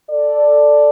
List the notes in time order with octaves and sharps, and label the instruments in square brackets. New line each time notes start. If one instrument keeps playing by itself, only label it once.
[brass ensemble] A4 D5